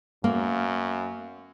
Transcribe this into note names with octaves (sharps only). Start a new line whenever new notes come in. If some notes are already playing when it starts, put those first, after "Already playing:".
F#2 A#3